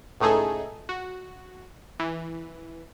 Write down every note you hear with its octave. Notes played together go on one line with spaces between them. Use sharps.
C#2 A2 A3 D#4 G#4 A4
F#4
E3